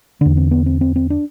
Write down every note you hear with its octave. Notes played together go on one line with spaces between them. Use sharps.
E2 D3 D4
C4
B3
C4
C4
C4
D4